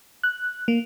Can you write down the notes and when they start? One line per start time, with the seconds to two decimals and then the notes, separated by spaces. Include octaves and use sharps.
0.23 F#6
0.68 A#3